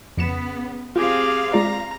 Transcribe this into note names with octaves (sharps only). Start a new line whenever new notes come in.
F2 C#3 B3 C#7 E7
C4 F4 G4 G#4 F5
G#3 F4 D5 A#5